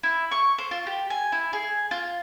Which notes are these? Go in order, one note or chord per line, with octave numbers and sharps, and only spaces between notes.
E4
C#6
C5
F4
G4
G#5
E4
G#4
F4